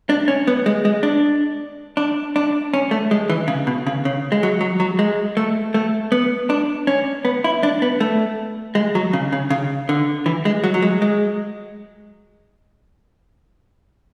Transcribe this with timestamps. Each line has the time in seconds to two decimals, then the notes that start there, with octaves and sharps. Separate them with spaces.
0.10 D4
0.28 C#4
0.47 B3
0.66 G#3
0.85 G#3
1.03 D4
1.97 D4
2.36 D4
2.74 C#4
2.91 A3
3.11 G#3
3.30 E3
3.48 C#3
3.67 B2
3.87 C#3
4.05 C#3
4.32 G#3
4.43 F#3
4.61 F#3
4.80 F#3
4.99 G#3
5.37 A3
5.74 A3
6.12 B3
6.50 D4
6.87 C#4
7.25 B3
7.44 E4
7.63 D4
7.82 B3
8.00 A3
8.75 G#3
8.95 F#3
9.13 C#3
9.32 C#3
9.50 C#3
9.89 D3
10.26 E3
10.45 G#3
10.64 F#3
10.74 F#3
10.82 G#3
11.02 G#3